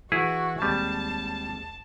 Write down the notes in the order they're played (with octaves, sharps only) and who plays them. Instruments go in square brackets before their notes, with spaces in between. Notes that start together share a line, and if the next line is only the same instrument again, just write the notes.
[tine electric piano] E3 [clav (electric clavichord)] E4 G#4 [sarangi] F#4
[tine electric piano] D#2 G#3 C4 [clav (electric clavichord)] G3 [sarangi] A5